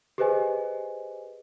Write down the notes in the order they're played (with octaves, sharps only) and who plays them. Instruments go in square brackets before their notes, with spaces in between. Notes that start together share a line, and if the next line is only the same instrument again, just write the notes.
[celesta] G4 G#4 B4 C5 D#5 G#5